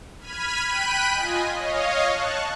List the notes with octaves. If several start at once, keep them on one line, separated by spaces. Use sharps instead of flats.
B5 F6 G#6 B6 D#7
G5 B5 F#6 B6 D#7
F4 D#5 G#5
C#5 D#5 F5
A5 C#6 F#6